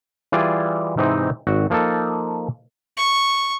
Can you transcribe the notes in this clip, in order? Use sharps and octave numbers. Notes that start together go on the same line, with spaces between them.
E3 G3 F4 G#4 D5
G#2 C3 E3 C4 D#4
G#1 F#4
F3 A#3 D#4 A4
C#6